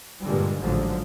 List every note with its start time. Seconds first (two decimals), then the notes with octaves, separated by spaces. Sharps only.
0.24 G2 A#2 D3 G3 G#3
0.60 A1 G#2 D3 F3 F#3 G#3